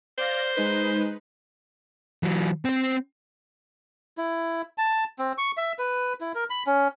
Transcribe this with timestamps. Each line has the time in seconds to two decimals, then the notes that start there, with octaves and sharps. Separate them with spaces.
0.18 C5 D5 F5 A#6
0.56 G#3 D#4 B4
2.23 E3 F#3
2.65 C4 C5
4.18 E4
4.78 A5
5.19 C4
5.38 C#6
5.57 E5
5.79 B4
6.21 E4
6.35 A#4
6.50 B5
6.67 C#4